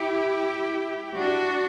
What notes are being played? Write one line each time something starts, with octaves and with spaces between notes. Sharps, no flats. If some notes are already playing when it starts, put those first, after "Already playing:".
Already playing: E4 G4
D4 F#4